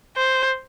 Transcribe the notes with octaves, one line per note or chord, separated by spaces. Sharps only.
C5